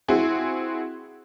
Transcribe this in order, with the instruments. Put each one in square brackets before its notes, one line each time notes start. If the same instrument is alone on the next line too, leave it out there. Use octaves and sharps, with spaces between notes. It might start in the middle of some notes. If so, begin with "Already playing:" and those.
[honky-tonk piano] C4 E4 F#4 G#4